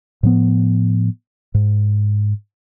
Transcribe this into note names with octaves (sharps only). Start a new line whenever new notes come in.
A2 F3 B3
G#2